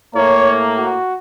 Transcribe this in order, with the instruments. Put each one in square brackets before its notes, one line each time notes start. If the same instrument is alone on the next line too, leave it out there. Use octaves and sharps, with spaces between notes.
[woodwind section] A2 A#3 [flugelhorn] C#5
[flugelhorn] F#4